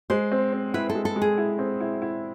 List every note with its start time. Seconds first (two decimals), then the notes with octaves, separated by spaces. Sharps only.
0.10 G#3 C5
0.32 C4
0.53 C4
0.74 E4 B4
0.90 A4
0.95 G#3
1.05 A4
1.16 G#3
1.22 G#4
1.38 E4
1.59 C4
1.80 E4
2.02 E4